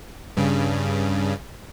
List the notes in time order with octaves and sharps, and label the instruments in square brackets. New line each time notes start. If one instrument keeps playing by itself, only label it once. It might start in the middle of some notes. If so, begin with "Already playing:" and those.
[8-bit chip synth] G2 C#3